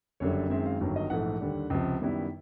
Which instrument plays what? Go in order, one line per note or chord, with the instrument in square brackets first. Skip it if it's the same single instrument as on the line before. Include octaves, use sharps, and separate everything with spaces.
[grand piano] F#1 F#2 D3 G3 C#5
F#2 D#3 G#3 C4 E5
F5
G1 G2 D#3 F#3
D#5
A#1 G#2 E3 A3 F#5
D#2 D3 G3
C#2 C3 F3
F#2 D#3 G3 B3 E4